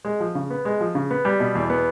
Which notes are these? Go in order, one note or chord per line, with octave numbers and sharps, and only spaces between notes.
G#3
F3
C#3
B3
G#3
F3
C#3
B3
G3
B2
E2
B3